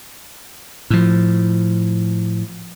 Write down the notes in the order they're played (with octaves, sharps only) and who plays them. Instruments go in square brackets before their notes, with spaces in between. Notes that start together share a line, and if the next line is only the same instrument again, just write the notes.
[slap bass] A2 F3